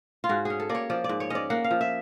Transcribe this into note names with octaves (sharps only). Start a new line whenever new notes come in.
F4
G#2 F#4
C#4 G#4
A4
A#3 D5
C#5
F3 D5
D5
G#2
C#5
C#4 D5 D#5
A#3 F#5
F5
F3
E5